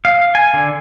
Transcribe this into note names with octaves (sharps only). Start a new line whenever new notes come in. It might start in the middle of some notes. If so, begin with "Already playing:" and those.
F5
G#5
D3